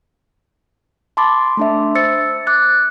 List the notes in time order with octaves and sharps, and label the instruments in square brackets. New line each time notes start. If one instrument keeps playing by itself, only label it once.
[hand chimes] A5 B5 C6 D6 A6
A3 D4 E5
C5 E6 A6 C#7
D6 F#6 A6